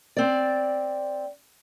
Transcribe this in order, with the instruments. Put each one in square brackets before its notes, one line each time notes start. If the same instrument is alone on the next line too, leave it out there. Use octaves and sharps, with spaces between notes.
[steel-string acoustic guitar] C4 D5